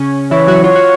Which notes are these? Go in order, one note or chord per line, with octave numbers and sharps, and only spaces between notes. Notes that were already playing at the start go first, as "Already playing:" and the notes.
Already playing: C#3 C#4
E3 E4 C#5
F#3 F#4
F4 C#5
F#4